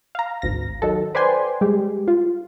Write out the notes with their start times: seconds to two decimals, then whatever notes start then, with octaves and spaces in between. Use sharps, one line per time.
0.15 F5 A#5
0.42 G#1 D2 A#6
0.82 D#3 F#3 A4
1.15 B4 C5 D5 G5 G#5 C6
1.61 G3 G#3 G4
2.08 F4